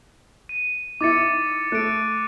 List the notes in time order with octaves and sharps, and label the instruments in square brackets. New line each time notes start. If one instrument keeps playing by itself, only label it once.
[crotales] D#7
[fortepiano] D#4 E4 [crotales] D6 A6 C#7
[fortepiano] A3 [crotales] F#6 D7